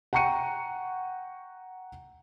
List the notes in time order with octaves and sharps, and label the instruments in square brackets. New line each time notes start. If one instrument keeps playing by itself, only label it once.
[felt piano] F#5 G5 A#5 C#6 C#7 D#7